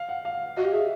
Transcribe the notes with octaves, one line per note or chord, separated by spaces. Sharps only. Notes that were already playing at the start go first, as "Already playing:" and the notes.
Already playing: F5
F#5
F5
F#4 D#5
G4 F5
G#4 E5